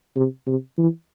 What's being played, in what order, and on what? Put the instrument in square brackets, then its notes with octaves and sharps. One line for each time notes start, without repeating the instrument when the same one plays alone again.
[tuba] C3
C3
E3